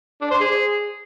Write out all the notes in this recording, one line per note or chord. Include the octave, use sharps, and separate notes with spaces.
D4
C5
G#4